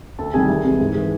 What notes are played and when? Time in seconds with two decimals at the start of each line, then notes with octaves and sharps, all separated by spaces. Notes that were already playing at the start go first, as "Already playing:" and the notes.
0.19 D2 A4 A5
0.34 C3 D#3 G3 G#4 G#5
0.49 C2
0.64 C3 E3 G#3
0.80 G#2
0.95 E3 G#3